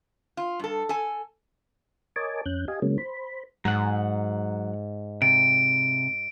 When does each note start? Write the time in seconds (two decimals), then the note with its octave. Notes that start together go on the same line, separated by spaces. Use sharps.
0.37 F4
0.60 G2 A4
0.89 A4 G#5
2.16 A#4 C#5 D#5 G#5 A5 D6
2.46 F2 C#4 F#6 G6
2.68 G4 D#5 F5 G#5
2.82 C#3 F#3 G#3 A#3 C#4
2.98 C5 B5
3.65 G#2 F#3 F#5
5.22 C3 D7